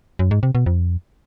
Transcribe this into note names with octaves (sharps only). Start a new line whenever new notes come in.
F#2
G#2
C3
B2
F2